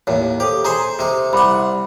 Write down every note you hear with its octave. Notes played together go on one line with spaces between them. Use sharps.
D#2 A2 C#5
G4 A4 C5
D#4 G#4 C5 A#5
C3 D#4
C2 F#5 B5 C6 D6